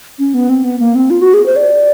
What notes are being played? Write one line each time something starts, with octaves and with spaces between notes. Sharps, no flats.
C#4
B3
C4
B3
A#3
C4
F4
F#4
G#4
C5
D5